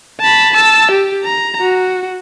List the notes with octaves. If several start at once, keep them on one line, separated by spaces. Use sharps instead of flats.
A5 B5
A5 E6
G4
A#5
F#4